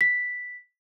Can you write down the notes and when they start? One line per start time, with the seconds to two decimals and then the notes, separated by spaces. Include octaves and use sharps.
0.01 B6